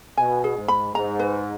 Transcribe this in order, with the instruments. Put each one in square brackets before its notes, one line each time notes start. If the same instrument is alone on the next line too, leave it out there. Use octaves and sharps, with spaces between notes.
[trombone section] B2 [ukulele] G#5
[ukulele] G#4
[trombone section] G#2
[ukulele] B5
[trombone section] G#2 [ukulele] A#5
[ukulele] B4